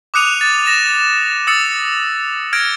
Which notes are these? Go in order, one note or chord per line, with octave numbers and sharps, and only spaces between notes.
D6 D#6 F#6 C#7 D#7 F7
A6
A#6 E7
D#6 E6 A6 C#7
F6 G#6 A#6 D7